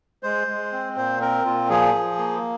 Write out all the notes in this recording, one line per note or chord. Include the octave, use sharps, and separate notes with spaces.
G#3 C5
G#3
C4
A#2 C5
C4 A#4
A#2 F4
F3 G#4
F3
A#3